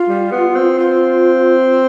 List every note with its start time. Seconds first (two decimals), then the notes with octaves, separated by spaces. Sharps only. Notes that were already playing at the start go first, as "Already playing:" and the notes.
Already playing: F4
0.09 G3
0.32 B3
0.55 C4
0.78 C4 F4